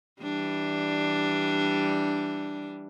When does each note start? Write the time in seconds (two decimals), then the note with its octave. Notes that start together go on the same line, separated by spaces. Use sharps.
0.22 E3 G3 D4